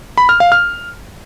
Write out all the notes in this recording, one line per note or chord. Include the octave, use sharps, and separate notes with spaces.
B5
F6
F5
F6